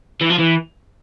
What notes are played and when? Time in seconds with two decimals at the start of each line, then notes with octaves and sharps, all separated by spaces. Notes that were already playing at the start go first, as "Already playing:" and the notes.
0.21 E3
0.30 F3
0.39 E3